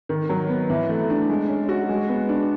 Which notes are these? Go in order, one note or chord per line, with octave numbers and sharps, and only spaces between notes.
D#3
F#3
B3
E3
A3
D4
G#3
C#4
F#4
G#3
B3
D4